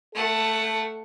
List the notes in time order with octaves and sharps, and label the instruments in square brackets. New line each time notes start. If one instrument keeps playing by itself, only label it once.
[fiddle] A3 F#5 [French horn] A4